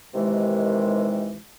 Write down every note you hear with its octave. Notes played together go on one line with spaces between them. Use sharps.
D#2 C3 D#3 E3 G#3